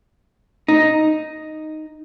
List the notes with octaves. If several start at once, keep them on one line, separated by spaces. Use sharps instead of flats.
D#4